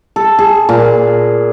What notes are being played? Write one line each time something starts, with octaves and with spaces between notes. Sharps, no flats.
A4
G#4
A#2